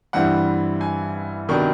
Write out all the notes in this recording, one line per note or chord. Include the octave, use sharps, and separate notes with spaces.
G2 E3 G3 C4 F#5
G#5
C3 D#3 F#3 B3 D4 C#6